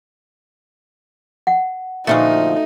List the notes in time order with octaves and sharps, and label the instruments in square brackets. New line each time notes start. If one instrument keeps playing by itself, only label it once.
[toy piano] F#5
[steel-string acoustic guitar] A#2 D3 F3 [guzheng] A3 F#4 F5 [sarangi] D#4